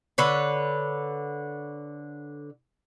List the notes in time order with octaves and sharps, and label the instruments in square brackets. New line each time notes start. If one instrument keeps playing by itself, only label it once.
[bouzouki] D3 B4 C#5